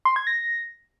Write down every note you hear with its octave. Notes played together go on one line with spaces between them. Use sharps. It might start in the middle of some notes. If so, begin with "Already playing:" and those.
C6
G#6
A#6